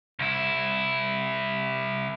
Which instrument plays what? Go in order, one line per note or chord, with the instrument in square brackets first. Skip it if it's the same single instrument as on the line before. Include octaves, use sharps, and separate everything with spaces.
[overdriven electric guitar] C2 E4